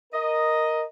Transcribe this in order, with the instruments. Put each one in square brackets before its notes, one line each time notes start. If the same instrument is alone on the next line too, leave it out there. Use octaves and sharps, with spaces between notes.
[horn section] A#4 D#5